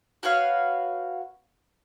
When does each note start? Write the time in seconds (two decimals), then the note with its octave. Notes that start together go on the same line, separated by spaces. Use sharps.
0.23 F#4 B4 C#5 F5